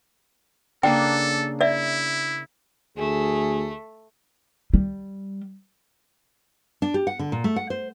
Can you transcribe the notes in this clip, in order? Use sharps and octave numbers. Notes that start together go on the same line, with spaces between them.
C#3 A#3 D4 A4 G5
E4 D5 E5
D2 A3 G#4
G3
D4
G4
F#5
D3
A#2
A3
F#5
C5